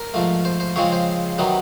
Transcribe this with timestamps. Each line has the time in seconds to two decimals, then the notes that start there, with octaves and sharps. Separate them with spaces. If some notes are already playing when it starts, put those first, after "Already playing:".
Already playing: A#4
0.14 G#2 F3 A3
0.45 C5
0.60 C5
0.76 C#3 F3 G#3 C4 C#5
0.92 C5
1.38 C3 D#3 F#3 B3